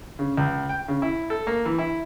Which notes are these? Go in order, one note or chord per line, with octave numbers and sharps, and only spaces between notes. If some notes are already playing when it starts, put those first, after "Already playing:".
C#3
C#2
G5
C#3
E4
A4
A#3
E3
E4